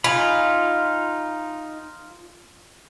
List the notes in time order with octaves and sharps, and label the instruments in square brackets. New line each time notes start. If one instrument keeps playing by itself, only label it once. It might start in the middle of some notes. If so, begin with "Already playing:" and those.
[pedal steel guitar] D#4 G#5 B5 [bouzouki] F4